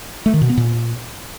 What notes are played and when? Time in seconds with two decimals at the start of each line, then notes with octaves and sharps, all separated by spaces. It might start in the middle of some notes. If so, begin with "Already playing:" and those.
0.26 A3
0.34 D#3
0.42 B2
0.49 B3
0.57 A#2